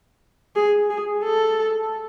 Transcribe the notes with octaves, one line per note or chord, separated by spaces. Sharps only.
G#4
G#4
A4